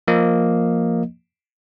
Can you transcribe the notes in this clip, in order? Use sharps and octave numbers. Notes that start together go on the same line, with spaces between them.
F3 A#3 D#5